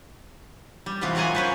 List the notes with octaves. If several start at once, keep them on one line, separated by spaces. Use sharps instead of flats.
G3
C3 E3 B3 F4
F#3 F4 A#4 F#5 G#5
C#4 B4 C5